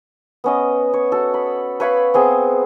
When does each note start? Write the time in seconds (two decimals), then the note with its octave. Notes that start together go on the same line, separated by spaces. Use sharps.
0.44 B3 C#4 D#5
0.94 C#5
1.12 F#4 A4
1.34 B5
1.80 B4 C#5 F5 B5
2.14 B3 C4 G#4